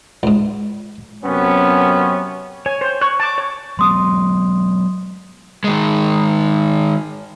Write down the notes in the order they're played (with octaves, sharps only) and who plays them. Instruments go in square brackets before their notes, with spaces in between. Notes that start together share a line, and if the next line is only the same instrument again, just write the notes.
[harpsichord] C#2 G#2
[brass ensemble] F#2 C3 B3 C#4
[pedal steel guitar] C#5 [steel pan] G#5
[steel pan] C5
[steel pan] C#5 [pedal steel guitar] C#6 F#6
[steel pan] A5 D6
C#5
[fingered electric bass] F#3 G#3 B3 [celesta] C6 D#6
[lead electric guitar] D#3 G#3